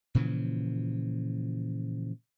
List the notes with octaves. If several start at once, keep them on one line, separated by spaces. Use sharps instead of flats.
A#2 C#3 E3 F3